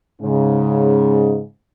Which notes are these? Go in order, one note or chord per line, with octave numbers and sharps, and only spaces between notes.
G#2 C#3